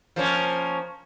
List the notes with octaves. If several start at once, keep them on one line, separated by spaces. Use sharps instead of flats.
F3 A#3 C#4